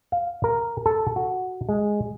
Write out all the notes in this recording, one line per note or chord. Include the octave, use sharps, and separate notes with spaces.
F5
A#4
A4
F#4
G#3